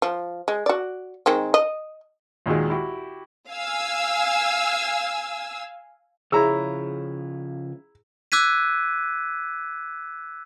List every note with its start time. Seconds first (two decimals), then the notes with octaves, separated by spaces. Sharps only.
0.02 F3
0.48 G#3
0.66 F#4 D5
1.26 D#3 G#3 C4
1.54 D#5
2.46 D#2 A#2 D#3 F#3 G#3
2.70 E4 F#4 G4
3.50 F5 G#5 E6
6.32 C#3 F3 E4 G#4 C#5 A#5 E6
8.32 D6 E6 F#6 G#6 B6 D#7